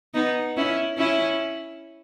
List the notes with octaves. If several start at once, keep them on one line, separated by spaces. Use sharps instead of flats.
B3 D#4
C#4 E4
C#4 E4